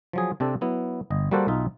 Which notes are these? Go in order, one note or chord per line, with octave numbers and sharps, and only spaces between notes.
F3 F#3 G#4
C3 C4 D4 A4
F#3 B3 E4
G1 D#5
G3 A#3 F#4 A4 C5 F#5
B1 D#4 F4 E5